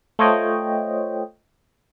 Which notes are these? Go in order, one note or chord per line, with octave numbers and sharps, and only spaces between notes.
A3 F4 C5 C#5 D#5 G5